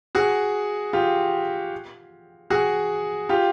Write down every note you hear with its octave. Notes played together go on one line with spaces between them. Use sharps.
F#4 G#4
F4 G4
F#4 G#4
F4 G4